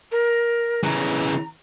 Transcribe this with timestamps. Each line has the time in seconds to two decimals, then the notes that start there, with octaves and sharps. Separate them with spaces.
0.11 A#4
0.84 C#3 E3 A#5